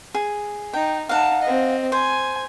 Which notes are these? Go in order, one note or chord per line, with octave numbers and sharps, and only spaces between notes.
G#4
D#4 G5
D#4 F5 F#5 A5
C4 D#5
C5 G#5